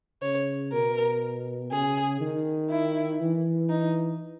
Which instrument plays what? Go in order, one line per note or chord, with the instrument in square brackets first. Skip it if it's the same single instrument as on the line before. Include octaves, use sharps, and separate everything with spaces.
[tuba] C#3 [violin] C#5
[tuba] B2 [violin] A#4
[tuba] C#3 [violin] G#4
[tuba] D#3
[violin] E4
[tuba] E3
[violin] D#4